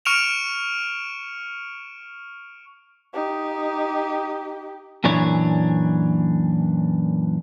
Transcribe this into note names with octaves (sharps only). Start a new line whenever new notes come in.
C#6 F6 C#7 D7 E7 F7
D#4 G4
F#2 A#2 E3 D4 C#5